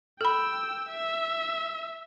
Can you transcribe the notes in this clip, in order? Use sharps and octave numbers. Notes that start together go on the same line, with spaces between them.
A4 G5 B5 E6
E5